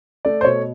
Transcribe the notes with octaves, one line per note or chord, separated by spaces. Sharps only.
A3 D5
C5
B2 C#5